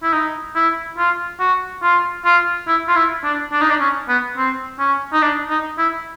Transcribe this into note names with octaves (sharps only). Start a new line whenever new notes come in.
E4
D#4
E4
F4
F#4
F4
F4
E4
F4
E4
D4
D4
D#4
D4
C#4
B3
C4
C#4
D#4
D4
D#4
E4